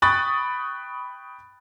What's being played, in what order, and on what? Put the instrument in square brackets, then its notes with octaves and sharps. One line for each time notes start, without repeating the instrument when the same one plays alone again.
[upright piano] G5 B5 C#6 D#6 F#6 A6